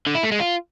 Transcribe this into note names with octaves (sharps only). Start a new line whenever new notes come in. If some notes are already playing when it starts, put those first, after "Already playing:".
D3
E4
A3
G#3
F4